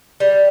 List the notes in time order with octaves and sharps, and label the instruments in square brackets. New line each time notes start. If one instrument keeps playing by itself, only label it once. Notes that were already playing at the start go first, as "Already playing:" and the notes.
[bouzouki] G3